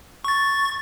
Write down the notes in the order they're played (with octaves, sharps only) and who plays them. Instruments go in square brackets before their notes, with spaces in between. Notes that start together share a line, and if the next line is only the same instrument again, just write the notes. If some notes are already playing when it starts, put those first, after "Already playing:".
[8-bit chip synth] C#6 A6